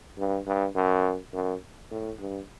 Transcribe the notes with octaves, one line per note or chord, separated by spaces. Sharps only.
G2
G2
F#2
F#2
A2
G2